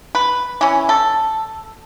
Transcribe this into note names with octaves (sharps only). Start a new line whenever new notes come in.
B4
E3 C#4
A4